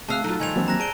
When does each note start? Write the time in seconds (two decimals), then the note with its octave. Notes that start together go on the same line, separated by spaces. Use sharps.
0.08 D2 A3 C4 G#4 F5 A5 E6 F#6
0.24 F#3 D#4 F4 A4
0.39 D#3 F3 G3 G#5 G#6 F7
0.56 E3 F#3 A#3 C4 D4 A5
0.68 A#5 F#6 A#6
0.80 G#4 C5 D5 A5 D7 G7